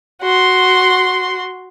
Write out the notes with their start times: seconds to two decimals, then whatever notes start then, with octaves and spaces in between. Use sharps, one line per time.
0.22 F#4 C6